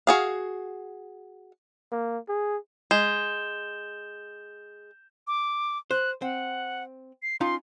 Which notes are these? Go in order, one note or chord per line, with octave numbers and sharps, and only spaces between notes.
F#4 G#4 F5
A#3
G#4
G#3 G6 E7 G7
D6
C5 F#6
C4 F#5
C7
C#4 D#4 F4 C6